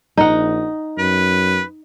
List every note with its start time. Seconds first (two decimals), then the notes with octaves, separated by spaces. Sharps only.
0.18 A#1 D#4 F#5
0.98 F#2 B4